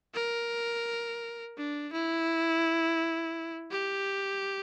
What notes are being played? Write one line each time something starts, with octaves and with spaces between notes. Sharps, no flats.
A#4
D4
E4
G4